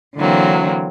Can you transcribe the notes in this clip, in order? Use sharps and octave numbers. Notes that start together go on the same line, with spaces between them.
D3 E3 F#3 A#3 C4